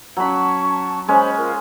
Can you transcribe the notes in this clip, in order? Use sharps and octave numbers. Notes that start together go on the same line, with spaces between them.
F#3 C#4 A5 B5 C#6
G#3 C#4 C5 B5
F4 A#4 D#5